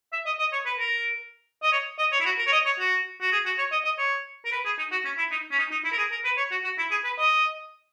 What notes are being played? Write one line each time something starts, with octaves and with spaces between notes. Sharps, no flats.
E5
D#5
D#5
C#5
B4
A#4
D#5
C#5
D#5
C#5
E4
F#4
A#4
C#5
D#5
C#5
F#4
F#4
G#4
F#4
C#5
D#5
D#5
C#5
A#4
B4
G#4
D#4
F#4
C#4
E4
D#4
C#4
D#4
D#4
E4
A#4
G#4
A#4
B4
C#5
F#4
F#4
E4
G#4
B4
D#5